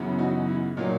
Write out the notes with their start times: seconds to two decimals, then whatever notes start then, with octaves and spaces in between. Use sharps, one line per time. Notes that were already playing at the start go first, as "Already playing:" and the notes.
Already playing: F#2 C#3 E3 B3
0.19 D#4 F#4
0.48 E4
0.77 A#2 F#3 A#3 D#4